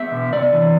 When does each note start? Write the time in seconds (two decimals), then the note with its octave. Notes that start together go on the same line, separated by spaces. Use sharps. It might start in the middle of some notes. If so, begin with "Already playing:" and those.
Already playing: B3 E5
0.12 B2
0.33 C3 D5
0.52 E3